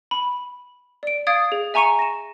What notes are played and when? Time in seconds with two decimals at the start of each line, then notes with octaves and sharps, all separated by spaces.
0.11 B5
1.03 D5 D7
1.27 F5 D#6 G#6 A6 D7
1.52 G#4
1.74 E5 G#5 A#5 C#6 C#7 D#7
1.99 A#6 E7